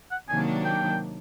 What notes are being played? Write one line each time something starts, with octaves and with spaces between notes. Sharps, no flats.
F#5
C3 D#3 F#3 A#3 D4 G#5
G5